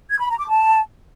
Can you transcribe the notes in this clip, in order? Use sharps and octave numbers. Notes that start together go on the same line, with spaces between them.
G#6
B5
A#5
D6
A5